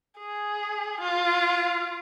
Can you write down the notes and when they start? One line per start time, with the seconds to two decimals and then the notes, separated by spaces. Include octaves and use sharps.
0.19 G#4
1.01 F4